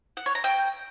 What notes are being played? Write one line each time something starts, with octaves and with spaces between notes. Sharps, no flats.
F#5
C#5
A#5
G5